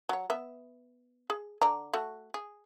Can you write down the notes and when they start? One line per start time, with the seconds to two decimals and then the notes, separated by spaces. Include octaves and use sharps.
0.09 F#3 C#5
0.30 B3 E5
1.30 G#4
1.62 D3 D5 A#5
1.93 A3 F#4
2.34 G#4